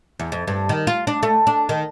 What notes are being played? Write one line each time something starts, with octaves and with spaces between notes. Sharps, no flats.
E2
F2
G2
D#3
F4
D4
A3
D4
D#3